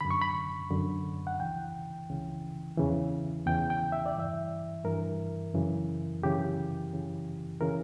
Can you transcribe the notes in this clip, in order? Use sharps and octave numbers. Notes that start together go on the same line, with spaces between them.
F#2 D3 B5
C#6
B5
F#2 D3
F#5
C#2 C#3 E3 G5
C#2 C#3 E3
E2 C#3 E3
E2 C#3 E3 G5
G5
E5
D5
G2 E3 E5
G2 E3 A#4
F#2 C#3 E3
F#2 C#3 E3 G4
F#2 C#3 E3
C#3 E3 A#4